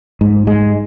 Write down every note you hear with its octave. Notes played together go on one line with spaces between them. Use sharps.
G#2
G#2 G#3